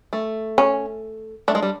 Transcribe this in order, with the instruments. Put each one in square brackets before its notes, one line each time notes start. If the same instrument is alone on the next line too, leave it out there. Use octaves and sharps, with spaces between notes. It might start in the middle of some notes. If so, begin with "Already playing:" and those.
[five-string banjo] A3
[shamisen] C#4
[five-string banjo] A3 [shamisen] D4
[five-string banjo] G#3
G3